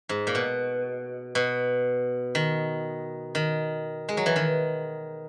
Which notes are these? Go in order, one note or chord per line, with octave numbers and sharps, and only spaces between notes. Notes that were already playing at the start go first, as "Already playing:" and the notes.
G#2
A#2
B2
B2
D#3
D#3
G#3
F#3
E3
D#3